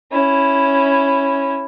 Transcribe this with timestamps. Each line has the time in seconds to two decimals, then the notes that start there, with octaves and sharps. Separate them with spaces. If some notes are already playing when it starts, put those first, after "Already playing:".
0.11 C#4 E4